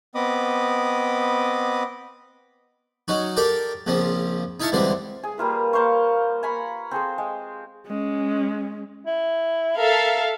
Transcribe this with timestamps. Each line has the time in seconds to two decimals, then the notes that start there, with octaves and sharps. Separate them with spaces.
0.15 B3 C4 D#5 B5 D6 D#6
3.08 F#3 C#4 D#4 F#4
3.36 G4 A4 A#4 D5 G5
3.87 A#1 C#3 F3 C4
4.60 D#4 E4 E5 F5 A5 C#6
4.72 C#2 D3 E3 G3 C4 C6
5.23 G#4
5.38 G3 A#3 F4 B4
5.73 A#3 C5 F5 C#6
6.43 G#5 A#5 B5 C#6
6.91 C4 G#4 A4 C5
7.18 G#3
7.87 G#3 C#4
9.06 E4
9.77 A4 A#4 E5 F5